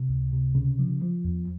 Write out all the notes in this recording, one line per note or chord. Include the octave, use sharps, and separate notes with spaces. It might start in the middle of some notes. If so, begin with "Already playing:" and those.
Already playing: C3
C#2
C3
C#3
F3
F3
E2